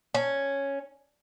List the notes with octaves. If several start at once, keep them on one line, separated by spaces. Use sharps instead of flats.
C#4